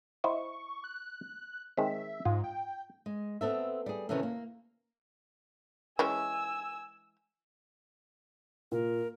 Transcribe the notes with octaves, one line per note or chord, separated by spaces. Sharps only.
E4 C5 D#5 C#6
F#6
D#3 G#3 C4 E5
G#2 F4
G5
G#3
B3 C4 A4 E5
G3 G#4
C3 D#3 E3 C#4 E4 A4
A#3
E3 G#3 C#4 G#5 E6
A#2 A#4